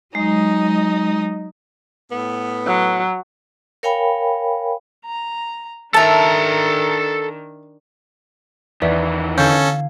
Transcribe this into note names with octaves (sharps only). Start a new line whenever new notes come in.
F#3 G#3 D#4 D#5
A2 B3
F#3
A#4 C#5 F5 G5 G#5 B5
A#5
D#3 D4 A4 E5 A5 A#5
E2 D#3 E3 B4 D5 E5
D3 C#4 A4 F5 G6 G#6